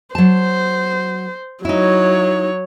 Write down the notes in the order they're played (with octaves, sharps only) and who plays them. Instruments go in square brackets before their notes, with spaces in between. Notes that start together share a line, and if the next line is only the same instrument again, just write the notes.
[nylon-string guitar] F#3 A5 [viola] C5
[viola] F#3 C#5 [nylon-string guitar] D#4 E4